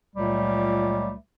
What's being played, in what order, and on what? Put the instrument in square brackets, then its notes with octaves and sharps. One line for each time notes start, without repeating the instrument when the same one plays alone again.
[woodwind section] C#2 A#2 F#3 G3 A3